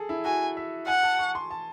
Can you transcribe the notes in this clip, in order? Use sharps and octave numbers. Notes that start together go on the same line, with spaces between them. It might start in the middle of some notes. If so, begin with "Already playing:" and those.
Already playing: G#4 A4
E4
F#4 G#5
E5
F#5 G#5
A5
C#6
C6
A5